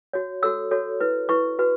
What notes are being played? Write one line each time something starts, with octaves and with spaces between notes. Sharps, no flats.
F#4 C#5
F#4 A4 C#5 E6
F#4 A4 C#5
E4 B4
E4 B4 C#6
F#4 B4